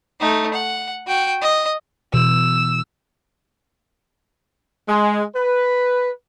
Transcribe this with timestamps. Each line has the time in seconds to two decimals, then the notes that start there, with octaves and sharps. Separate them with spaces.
0.20 A3 D#4
0.53 F#5
1.08 F#4 G5
1.41 D#5
2.14 B2 E3 E6
4.89 G#3
5.36 B4